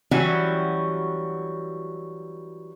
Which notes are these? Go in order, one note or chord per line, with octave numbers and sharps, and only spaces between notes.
E3 F#3 G3 C#4 E4 F#4